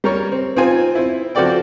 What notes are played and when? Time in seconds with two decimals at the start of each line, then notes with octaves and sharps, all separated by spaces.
0.04 G3 A#4 C#5
0.32 C4
0.57 C4 D#4 F4 C5 G#5
0.95 C4 E4
1.35 F3 C4 F#4 A4 D5 G5